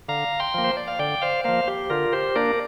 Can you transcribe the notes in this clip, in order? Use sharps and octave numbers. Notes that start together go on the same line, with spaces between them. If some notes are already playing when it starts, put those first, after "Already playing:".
D3 F5 A#5
G5 C6
F3 A#3
C5
D5
F5
D3 D5 G5
C5 F5
F3 A#3 C5 F5
G4
D3 F4 A#4
G4 C5
A#3 D4 A#4 D5